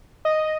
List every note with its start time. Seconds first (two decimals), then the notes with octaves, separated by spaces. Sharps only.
0.25 D#5